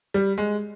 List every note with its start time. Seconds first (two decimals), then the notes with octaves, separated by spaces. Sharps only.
0.14 G3
0.38 G#3